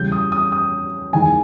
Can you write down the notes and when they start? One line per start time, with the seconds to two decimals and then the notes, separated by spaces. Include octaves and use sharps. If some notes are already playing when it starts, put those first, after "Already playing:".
Already playing: E2 C#3 G3 G6
0.12 D#6
0.32 D#6
0.52 D#6
1.13 E2 D#3 G#3 G#5